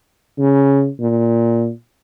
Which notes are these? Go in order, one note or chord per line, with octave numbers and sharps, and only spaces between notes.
C#3
A#2